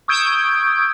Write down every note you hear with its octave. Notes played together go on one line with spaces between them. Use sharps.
C#6 D#6 E6 G6 G#6 D7